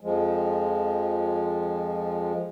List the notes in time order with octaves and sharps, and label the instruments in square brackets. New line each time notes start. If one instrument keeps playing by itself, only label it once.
[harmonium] F2 F3 G#3